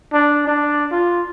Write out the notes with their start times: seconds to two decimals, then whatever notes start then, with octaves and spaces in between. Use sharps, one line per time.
0.13 D4
0.47 D4
0.91 F4